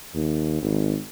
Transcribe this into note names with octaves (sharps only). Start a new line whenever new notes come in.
D#2
G#1